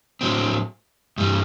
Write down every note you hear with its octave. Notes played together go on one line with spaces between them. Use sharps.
A2 F#3 C4
G2 E3 G3